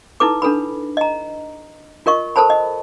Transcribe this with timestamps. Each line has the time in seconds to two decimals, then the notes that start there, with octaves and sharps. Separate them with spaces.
0.20 D#4 E4 A4 B4 D6
0.42 D4 A4 B4 B5
0.97 D#5 A#5
2.06 F4 A#4 D#5 C#6
2.36 A4 A#4 C5 A5 B5
2.50 D#5